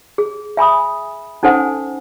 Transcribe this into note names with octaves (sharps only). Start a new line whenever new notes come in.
G#4
E5 G#5 B5 D#6
C#4 D#4 A4 C5 F#5 G#5